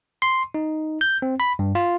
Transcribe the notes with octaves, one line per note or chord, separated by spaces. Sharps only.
C6
D#4
G6
C4
B5
G2
F4